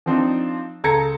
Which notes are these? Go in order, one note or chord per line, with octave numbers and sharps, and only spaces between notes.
F3 C4 D4 D#4
C#2 A4 A#5 G#6 A#6 C#7